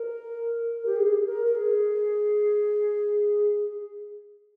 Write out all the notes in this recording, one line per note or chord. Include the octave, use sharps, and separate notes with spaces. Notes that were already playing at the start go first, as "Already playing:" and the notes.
Already playing: A#4
G4
G#4
A#4
A#4
G#4